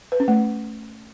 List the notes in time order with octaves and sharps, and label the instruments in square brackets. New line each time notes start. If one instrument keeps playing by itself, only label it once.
[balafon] B4
C#4
A3